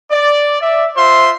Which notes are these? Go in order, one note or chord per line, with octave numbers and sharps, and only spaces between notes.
D5
D5 E5
F4 C5 E5 C6